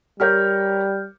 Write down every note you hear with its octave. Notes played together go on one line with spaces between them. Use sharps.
G3 G4 A#4 C#5 F6 G6